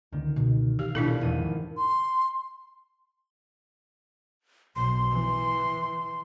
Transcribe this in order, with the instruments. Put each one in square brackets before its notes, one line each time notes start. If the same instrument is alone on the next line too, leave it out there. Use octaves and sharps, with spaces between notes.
[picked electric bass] C#2 D3 [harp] D#3
[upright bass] B2 A#3
[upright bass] E3 [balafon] G4 [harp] F5
[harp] D#1 A#1 [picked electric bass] B2 [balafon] D4 E4 A4
[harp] G#1 E3 D#7 [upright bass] E2
[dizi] C6
[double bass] B1 [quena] C6
[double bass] E3